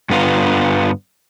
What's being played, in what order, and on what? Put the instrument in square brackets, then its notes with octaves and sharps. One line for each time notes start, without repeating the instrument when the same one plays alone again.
[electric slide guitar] G2 D3 B3 F4